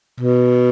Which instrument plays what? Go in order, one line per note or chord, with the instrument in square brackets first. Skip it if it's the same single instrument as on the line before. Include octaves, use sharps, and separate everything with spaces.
[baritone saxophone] B2